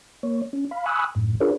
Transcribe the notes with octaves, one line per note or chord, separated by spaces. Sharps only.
A#3 C#5
C#4
F5 B5
G#5 B5 C#6 D#6 E6 F#6
F#2 A2
D4 F4 G#4 A#4 B4 C#5